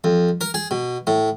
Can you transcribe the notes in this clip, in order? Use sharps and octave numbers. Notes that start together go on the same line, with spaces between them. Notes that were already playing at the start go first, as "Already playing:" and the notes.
F2
A#4
G#4
B2
A2